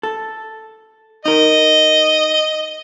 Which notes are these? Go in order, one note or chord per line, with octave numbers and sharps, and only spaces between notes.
A4
D#4 A#4 D#5